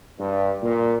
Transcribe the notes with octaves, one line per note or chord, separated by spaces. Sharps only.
G2
A#2